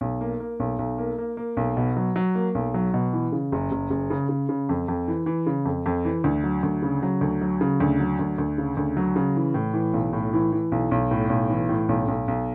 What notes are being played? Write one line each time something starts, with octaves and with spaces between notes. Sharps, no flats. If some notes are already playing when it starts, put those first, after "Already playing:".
B1
A#3
A#3
B1
B1
A#3
A#3
A#3
B1
B2
F#3
F#3
A#3
B1
F#3
B2
E3
C#3
F#1
F#1
F#1
C#3
C#3
C#3
F2
F2
E3
E3
C#3
F2
F2
E3
D2
F#3
D2
C#3
F#3
D2
F#3
C#3
D2
F#3
D2
D2
C#3
D2
F#3
C#3
E3
A2
E3
B1
A2
E3
E3
B1
B1
A2
B1
E3
A2
B1
B1
B1